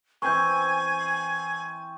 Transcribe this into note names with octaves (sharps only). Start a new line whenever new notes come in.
E3 C4 B4 G#5 C#6 G6